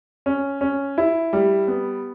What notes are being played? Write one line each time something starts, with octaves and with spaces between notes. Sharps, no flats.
C#4
C#4
E4
G3
B3